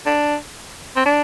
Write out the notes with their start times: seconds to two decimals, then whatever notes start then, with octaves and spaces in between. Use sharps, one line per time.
0.06 D4
0.96 C4
1.06 D4